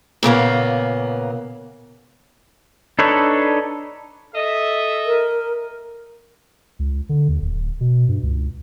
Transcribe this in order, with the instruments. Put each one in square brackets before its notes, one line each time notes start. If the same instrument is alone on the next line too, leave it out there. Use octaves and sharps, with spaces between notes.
[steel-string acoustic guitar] A#2 C#3 A#3 B3
[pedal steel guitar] D4 D#4 A4 B4 C#5
[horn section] A4 D#5 E5
[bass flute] A#4
[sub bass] C#2
D3
D#2
D1
B2
G2
C#2